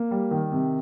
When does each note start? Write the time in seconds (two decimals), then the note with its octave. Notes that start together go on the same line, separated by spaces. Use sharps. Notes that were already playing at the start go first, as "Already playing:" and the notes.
Already playing: A#3
0.11 G3
0.31 D#3
0.52 C3